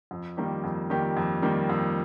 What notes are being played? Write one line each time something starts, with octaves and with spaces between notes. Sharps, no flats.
F2
D#3 G3 A#3 G4
F2
D#3 G3 A#3 G4
F2
D#3 G3 A#3 G4
F2